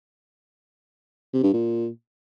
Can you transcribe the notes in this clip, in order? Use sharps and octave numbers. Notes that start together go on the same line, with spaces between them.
C3
G2
A#2